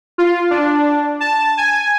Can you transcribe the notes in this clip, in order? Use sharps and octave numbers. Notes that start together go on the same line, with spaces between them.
F4
D4
A5
G#5